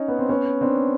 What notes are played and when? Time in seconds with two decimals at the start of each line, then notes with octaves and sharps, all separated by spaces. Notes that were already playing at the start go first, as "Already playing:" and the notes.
Already playing: C#4 D#4
0.08 B3
0.19 C4
0.29 B3 C#4
0.61 C4 D4